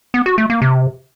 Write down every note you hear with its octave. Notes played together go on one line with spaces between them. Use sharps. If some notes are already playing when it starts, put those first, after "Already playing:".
B3
F#4
A3
A#3
C3